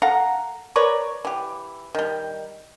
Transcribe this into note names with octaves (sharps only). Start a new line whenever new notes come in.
A4 F5 F#5 A#5
A#4 B4 C#5 D5
E3 G4
D#3 G3